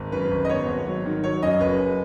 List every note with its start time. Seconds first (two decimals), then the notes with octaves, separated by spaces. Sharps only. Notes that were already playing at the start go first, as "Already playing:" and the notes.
Already playing: G#1
0.12 F#2 B4
0.31 G#1
0.45 D#5
0.49 B3 C#5
0.68 G#1
0.86 F#3
1.05 D#3
1.24 F#3 C#5
1.42 F#2 D#5
1.60 F#1 B4